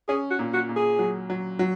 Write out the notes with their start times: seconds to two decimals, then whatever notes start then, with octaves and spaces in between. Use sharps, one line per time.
0.08 C#4 G#4
0.31 F#4
0.39 A#2
0.54 F#4
0.69 A#2
0.76 G#4
0.99 F#3
1.30 F#3
1.59 F#3